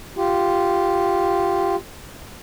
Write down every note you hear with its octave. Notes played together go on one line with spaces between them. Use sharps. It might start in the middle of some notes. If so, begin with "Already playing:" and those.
F4 G4